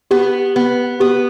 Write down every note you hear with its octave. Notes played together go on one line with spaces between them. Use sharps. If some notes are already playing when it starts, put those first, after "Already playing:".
B3 G4
B3
B3 G4